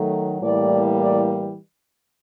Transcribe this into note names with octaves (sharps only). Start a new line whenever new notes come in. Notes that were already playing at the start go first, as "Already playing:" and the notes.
Already playing: D#3 F#3 A3
A2 E3 G3 A#3 D5
D5